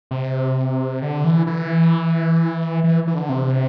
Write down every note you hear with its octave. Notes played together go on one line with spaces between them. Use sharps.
C3
D3
E3
E3
E3
E3
D3
C3